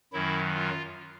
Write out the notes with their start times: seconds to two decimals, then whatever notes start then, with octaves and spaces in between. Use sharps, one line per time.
0.12 F#2 D#3 F#3 E4
0.54 F4